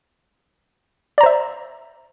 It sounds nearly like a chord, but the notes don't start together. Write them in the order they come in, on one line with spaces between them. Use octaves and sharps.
D5 A#5 C5 E5